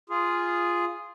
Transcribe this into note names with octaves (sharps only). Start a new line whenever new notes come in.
F4 G#4